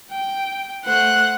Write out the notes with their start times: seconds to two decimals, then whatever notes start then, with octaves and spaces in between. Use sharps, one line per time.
0.11 G5
0.85 A3 C5 F#5 F#6